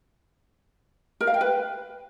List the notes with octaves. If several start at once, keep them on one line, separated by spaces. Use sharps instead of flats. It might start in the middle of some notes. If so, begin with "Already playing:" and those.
A#4
F5
G5
B4